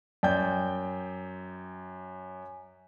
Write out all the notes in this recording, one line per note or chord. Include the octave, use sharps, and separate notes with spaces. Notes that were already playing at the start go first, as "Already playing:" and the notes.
F#2 D5 G5 G6